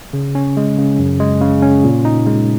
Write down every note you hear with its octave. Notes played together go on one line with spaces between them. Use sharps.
C#3
C#4
G#3
C#3
F#2
G#3
C#3
C#4
A#2
D#4
G#3